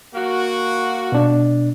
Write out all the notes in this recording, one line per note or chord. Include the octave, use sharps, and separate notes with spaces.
A#3 F#4
B2 D4